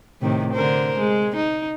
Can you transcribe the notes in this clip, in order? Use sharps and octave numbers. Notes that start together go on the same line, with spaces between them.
A2 C3 D#3
D3 A#4 C5
G#3
D#4